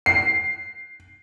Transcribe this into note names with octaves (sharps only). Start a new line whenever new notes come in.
C7